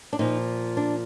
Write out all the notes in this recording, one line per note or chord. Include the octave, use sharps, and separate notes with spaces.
D4
A#2 F3 D#4
D4